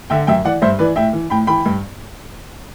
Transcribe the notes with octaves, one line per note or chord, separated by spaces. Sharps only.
D3 E5 G5
F#2 E5 G5
E3 D5 F#5
G2 C5 E5
E3 B4 D5
A2 E5 G5
E3
A2 G5 B5
E3 G5 B5
G2